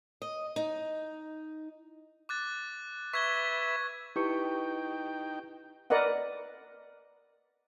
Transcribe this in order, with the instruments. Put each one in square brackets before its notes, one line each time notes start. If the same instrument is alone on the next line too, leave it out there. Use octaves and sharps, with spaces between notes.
[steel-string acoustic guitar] D#5
D#4
[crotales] D6 F#6 A6
[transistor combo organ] B4 E5 [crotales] C#6 G#6 G7
[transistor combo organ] D#4 G5 [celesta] E4 B4 C#7 [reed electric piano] G4 C#6
[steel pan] A#4 B4 D5 D#5 F#5